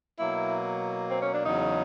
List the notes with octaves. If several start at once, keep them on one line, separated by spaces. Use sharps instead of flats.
B2 F#3 A#3 E4
C4
C#4
D4
E2 C#3 F#3 D#4